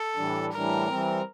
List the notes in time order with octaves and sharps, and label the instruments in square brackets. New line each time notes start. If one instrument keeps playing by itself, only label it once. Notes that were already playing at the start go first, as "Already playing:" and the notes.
Already playing: [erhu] A4
[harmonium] A2 E3 G3 D4
[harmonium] A2 E3 G3 D4 [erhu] A#4
[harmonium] E3 G3 C4